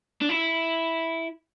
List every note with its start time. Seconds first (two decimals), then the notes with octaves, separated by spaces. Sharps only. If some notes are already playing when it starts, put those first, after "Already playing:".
0.22 D4
0.29 E4